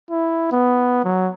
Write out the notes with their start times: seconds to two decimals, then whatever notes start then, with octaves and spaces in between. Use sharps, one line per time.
0.11 E4
0.52 B3
1.04 F#3